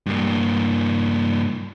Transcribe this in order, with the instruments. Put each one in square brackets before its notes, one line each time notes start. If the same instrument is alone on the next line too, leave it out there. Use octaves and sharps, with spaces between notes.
[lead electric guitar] G2 A#3